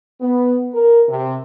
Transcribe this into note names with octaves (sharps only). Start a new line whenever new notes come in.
B3
A#4
C3